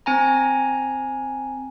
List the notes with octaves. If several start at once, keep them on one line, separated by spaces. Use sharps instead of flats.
C4 G#5 A#5